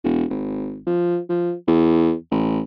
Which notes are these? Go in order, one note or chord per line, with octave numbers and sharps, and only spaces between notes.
E1
G#1
F3
F3
E2
A1